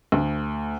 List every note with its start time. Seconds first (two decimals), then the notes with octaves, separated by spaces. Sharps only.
0.12 D2